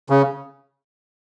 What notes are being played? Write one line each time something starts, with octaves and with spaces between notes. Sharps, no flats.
C#3